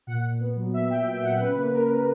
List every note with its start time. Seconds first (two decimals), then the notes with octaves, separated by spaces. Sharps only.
0.07 A#2 F#5
0.24 A#2
0.40 B3
0.56 F#3
0.73 F#3 E5
0.90 A#2 G5
1.07 A#2 G5
1.23 A#2 F#5
1.40 C#3 B4
1.56 A#3
1.72 C#3 A#4
1.89 C#3